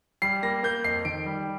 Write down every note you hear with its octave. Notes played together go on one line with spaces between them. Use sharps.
G3 C7
A#3 A#6
A#3 G6
F2 C7
D#3 D7
G3